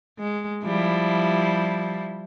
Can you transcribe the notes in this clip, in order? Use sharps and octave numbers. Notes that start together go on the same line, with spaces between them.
G#3
F3 G3 E4